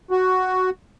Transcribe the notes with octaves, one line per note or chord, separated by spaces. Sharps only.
F#4